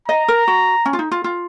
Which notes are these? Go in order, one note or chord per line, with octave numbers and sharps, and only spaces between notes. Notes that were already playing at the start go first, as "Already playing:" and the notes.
D#5 A#5
A#4
F#4
C#4
F4
D#4
F4
F4